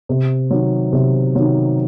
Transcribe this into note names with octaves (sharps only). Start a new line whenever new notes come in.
C3
D#3 F#3
C3
D#3 F#3